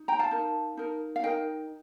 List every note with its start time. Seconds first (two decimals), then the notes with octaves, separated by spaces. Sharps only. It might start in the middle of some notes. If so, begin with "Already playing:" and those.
Already playing: D#4
0.08 G5 A#5
0.19 F5 A5
0.31 D#4 A#4
0.77 D#4 A#4
1.16 F5
1.23 D#4 A#4 D#5 G5